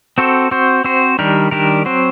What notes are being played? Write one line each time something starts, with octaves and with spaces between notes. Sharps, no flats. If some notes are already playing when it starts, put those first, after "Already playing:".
C4 F#4 A4 C5
C4 F#4 C5
C4 F#4 C5
D#3 G3 D4 G4 A#4
D#3 G3 D4 G4 A#4
F#3 C4 F#4 C5